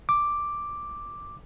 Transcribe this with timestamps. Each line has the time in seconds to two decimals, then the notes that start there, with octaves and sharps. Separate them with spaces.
0.09 D6